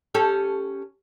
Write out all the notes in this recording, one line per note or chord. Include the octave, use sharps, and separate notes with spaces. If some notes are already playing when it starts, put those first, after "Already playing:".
C#4 G4 A4